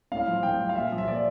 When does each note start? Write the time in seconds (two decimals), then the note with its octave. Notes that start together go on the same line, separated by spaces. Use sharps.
0.12 A2 F5
0.27 F3
0.43 A2 G5
0.60 F3
0.69 F5
0.75 A#2 E5
0.92 F3
0.98 E5
1.07 A#2 D5